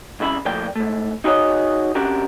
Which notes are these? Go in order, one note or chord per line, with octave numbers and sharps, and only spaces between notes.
C2 C#3 E4 E5 B5
A2 F3 A#3 D5 G5
G#2 A3
D#4 F#4 G#4 A#4 C#5 D#5
C3 C#4 D4 F#4 G4 A#4